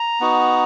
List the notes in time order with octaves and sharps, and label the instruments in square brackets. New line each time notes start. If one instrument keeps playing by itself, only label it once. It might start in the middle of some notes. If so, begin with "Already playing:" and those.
Already playing: [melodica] A#5
B3 D#4 F#4